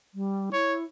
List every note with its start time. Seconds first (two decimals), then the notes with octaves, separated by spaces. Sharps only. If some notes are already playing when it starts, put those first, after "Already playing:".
0.14 G3
0.53 E4 C#5